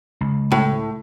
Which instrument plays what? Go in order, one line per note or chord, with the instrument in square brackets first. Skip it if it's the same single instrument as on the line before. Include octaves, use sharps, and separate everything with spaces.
[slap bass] C#2
[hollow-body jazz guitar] A2